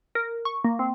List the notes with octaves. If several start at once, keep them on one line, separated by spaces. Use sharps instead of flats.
A#4
C#6
A#3
C4